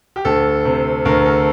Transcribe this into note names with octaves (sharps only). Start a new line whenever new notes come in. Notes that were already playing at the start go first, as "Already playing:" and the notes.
G4
D2 A4
C3
D2 A#4
A4